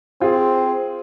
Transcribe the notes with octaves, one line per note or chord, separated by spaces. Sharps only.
C4 F4 G#4